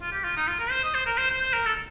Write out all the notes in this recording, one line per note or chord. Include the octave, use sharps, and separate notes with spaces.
F4
G4
F4
D#4
F4
A#4
C5
D#5
C5
A#4
C5
C5
C5
A#4
A4